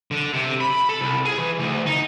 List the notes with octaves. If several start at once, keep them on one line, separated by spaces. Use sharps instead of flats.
D3
C3
B5
A4
C2
G#4
E3
D2
D#4